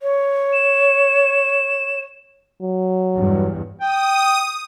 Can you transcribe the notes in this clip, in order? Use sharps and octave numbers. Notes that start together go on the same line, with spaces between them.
C#5
E7
F#3
E2 G2
G5 D#6